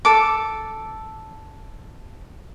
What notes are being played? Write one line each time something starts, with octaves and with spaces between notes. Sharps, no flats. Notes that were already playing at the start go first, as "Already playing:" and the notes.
A4 D6